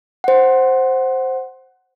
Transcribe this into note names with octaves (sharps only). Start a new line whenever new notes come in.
C5 F#5